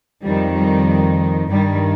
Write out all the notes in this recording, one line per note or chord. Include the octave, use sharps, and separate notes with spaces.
F2 D#3 G3
G3
G2 D#3 G3